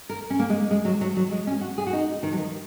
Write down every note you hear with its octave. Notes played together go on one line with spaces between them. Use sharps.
A#4
C#4
A#3
G#3
G#3
F#3
F#3
F#3
G#3
C#4
F#4
G#4
F#4
D#4
D#3
F#3
D#3